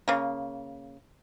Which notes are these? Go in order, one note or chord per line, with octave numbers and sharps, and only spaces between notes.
C#3 A#3